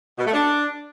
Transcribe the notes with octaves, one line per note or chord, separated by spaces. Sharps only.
B2
A3
D4